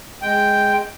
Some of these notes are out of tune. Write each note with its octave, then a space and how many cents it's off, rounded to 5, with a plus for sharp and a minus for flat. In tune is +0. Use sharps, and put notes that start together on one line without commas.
G#3 +0 G5 +0